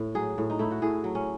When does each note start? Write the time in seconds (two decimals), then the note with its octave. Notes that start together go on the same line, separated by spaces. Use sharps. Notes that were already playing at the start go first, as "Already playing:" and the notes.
Already playing: A2
0.15 F#3 G#4
0.38 A2
0.50 D#4
0.59 A3 E4
0.71 F#4
0.82 A2 G#4
1.04 F#3
1.15 C#4